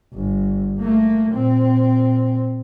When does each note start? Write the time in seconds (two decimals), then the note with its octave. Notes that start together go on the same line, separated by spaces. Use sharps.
0.13 G1
0.78 A3 A#3
1.32 A#2 C4